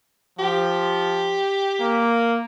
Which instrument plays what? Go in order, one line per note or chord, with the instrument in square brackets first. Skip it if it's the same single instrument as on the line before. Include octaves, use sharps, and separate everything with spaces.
[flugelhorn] F3 [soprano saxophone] G4
[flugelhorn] A#3